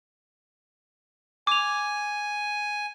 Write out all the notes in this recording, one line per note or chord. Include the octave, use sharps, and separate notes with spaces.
G#5 D6 F7